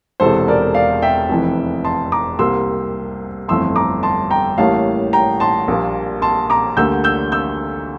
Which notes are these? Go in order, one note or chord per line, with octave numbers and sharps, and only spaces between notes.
E1 E2 C3 E3 A4 C5
A#4 D5
D5 F5
E5 G5
F1 F2 E3
A5 C6
A#5 D6
C2 C3 G3 A#3 C6 E6
G1 F2 E3 A3 C6 E6
A#5 D6
A5 C6
G5 A#5
A1 A2 G3 A#3 F5 A5
G5 A#5
A5 C6
A#1 A#2 G3
A5 C6
A#5 D6
D2 D3 G3 A#3 E6 G6
E6 G6
E6 G6